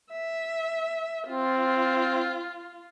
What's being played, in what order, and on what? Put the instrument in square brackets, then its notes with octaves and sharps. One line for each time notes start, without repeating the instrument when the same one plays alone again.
[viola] E5
[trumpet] C4 [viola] F4